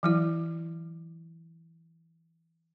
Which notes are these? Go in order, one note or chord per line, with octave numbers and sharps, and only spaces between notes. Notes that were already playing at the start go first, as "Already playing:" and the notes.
E3 F#3 E4